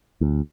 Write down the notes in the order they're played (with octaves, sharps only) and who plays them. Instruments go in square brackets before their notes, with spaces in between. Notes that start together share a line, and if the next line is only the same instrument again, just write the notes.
[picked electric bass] D2